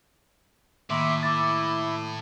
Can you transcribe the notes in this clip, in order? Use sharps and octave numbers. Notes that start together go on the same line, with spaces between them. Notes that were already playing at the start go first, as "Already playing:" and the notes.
A2 D#3 A#3 E5 B5 C6 D6
E4 D6 A6